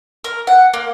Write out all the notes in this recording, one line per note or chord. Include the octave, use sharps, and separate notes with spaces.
A#4
F#5
A#3